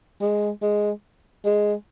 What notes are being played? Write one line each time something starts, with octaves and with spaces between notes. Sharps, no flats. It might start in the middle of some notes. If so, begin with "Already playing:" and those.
G#3
G#3
G#3